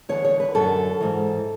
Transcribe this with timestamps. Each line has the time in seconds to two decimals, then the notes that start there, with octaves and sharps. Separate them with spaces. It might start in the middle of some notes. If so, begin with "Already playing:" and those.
0.09 E2 D3 C#5
0.25 C#5
0.40 B4
0.55 F#2 D3 A4
1.01 G#2 E3